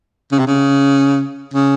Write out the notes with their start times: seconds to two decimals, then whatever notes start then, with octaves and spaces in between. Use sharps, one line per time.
0.32 C#3
0.39 C3
0.47 C#3
1.54 C#3